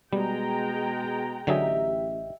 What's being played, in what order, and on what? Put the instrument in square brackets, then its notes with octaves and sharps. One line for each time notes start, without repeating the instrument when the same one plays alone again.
[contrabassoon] B2 [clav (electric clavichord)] G3 [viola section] G#3 G5 A#5
[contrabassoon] A1 [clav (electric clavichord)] D3 F#3 G#4 [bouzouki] G4 D#5 E5